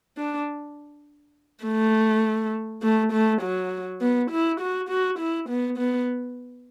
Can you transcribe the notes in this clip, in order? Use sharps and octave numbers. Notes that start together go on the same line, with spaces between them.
D4
A3
A3
A3
F#3
B3
E4
F#4
F#4
E4
B3
B3